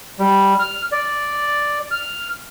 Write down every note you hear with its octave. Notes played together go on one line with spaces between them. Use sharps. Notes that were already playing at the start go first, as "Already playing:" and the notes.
G3
F6
D5
F6